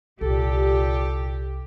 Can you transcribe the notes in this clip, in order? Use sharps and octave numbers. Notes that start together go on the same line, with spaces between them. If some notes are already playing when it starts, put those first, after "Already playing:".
C2 A#2 G4 A4